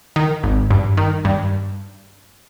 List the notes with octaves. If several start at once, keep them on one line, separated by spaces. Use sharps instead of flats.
D#3
G#1
G2
D#3
G2